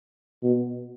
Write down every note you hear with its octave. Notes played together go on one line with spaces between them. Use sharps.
B2